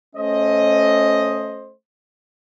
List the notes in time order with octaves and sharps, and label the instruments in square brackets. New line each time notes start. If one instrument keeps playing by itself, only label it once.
[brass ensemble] A3 C#4 C5 D#5